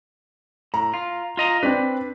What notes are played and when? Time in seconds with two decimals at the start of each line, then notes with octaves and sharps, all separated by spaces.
0.74 A2 A#5
0.94 F4
1.37 F4 D#5 A#5
1.63 C4 D4 B4